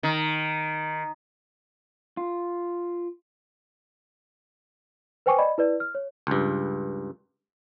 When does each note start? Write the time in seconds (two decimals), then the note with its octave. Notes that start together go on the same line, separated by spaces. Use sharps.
0.03 D#3
2.17 F4
5.26 B4 C5 G5 G#5 C#6 D6
5.38 D5 D#5 B5
5.58 E4 B4 D5
5.80 F6
5.95 C#5
6.27 C#2 G2